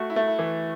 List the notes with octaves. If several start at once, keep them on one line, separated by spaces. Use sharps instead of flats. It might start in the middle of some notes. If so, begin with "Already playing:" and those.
Already playing: A3 F#4
E4
A3
E4
E3